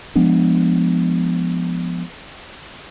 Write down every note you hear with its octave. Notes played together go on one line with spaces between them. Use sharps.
F3 G#3 B3 D4